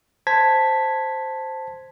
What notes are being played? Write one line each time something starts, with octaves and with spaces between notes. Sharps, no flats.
C5 A5 G#6 B6